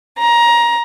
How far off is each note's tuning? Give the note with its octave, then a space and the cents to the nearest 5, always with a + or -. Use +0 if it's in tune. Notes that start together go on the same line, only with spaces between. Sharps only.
A#5 +20